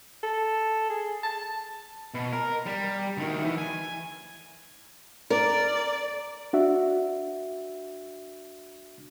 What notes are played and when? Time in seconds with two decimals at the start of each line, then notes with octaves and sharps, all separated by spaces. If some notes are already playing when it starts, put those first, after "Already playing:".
0.24 A4
0.90 G#4
1.23 A5
2.14 B2
2.33 A#4
2.66 G3
3.17 D2 D#3
3.45 E3
3.58 G#5
5.30 A#4 D5
6.53 D4 F#4 E5